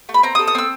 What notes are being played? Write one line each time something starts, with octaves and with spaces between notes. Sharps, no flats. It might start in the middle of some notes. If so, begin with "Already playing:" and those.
A3
B5
C4 A#5
D#6
A4
D#6
C4 E6